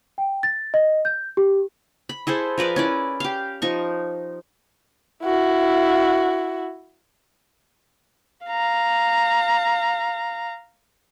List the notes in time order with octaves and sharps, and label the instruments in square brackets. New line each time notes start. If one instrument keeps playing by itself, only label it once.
[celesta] G5
A6
D#5
G6
G4
[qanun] B5
E4 G#4 A4 C5
F3 A#4 B4 D5
C#4 E4 D5
G4 F5
F3 D#4 C#6
[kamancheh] E4 F#4
F5 A#5